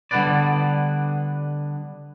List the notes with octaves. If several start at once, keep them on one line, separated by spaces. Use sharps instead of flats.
D3 G3 B3 D4 B4 D5